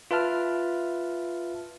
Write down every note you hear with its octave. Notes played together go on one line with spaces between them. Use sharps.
F4 B4 E5 A5 F6